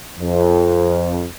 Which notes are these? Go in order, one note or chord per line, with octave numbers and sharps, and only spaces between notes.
F2